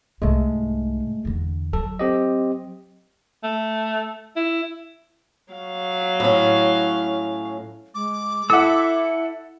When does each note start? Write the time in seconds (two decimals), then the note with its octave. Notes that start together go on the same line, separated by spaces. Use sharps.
0.22 C2 G#2 G#3 A3
1.25 E2 D3
1.73 F#3 A4
1.99 C4 G4 D#5
3.43 A3
4.36 E4
5.53 F#3 F5
6.20 A2 C#4
7.95 G#3 D6
8.50 E4 A4 E5 F#5 E6